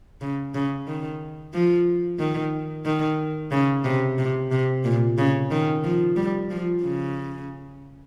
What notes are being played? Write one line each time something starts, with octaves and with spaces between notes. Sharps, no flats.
C#3
C#3
D#3
F3
D#3
D#3
C#3
C3
C3
C3
A#2
C#3
D#3
F3
G3
F3
C#3